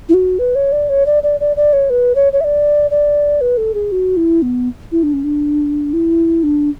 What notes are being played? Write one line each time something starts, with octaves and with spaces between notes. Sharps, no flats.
E4
F#4
B4
C#5
D5
C#5
D5
D5
D5
D5
C#5
B4
C#5
C#5
E5
D5
D5
B4
A4
G#4
F#4
E4
B3
E4
D4
C#4
D4
E4
D4